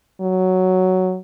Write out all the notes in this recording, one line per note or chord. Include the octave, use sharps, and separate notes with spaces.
F#3